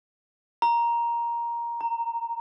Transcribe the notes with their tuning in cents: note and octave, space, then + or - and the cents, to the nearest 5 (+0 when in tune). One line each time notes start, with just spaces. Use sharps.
A#5 +10
A#5 -15